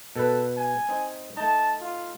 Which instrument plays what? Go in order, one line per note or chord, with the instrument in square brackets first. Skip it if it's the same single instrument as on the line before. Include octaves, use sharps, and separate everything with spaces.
[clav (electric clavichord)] B2 B4 [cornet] A4
[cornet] G#5
[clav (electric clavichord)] C4 D#4
[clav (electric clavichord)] A3 D#4 [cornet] A5
[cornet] F4